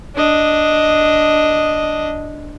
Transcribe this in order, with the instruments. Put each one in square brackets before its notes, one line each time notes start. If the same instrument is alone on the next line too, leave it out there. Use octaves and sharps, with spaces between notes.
[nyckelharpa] D4 D#5